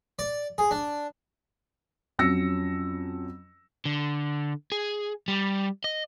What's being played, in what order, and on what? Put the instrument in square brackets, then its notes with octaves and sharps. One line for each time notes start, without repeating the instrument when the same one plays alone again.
[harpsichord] D5
G#4
D4
[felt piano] F2 F#3 C#4 E6 A#6 C#7
[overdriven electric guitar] D3
G#4
G3
D#5